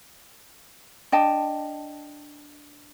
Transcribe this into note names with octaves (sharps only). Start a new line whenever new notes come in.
D4 D#5 G5 A5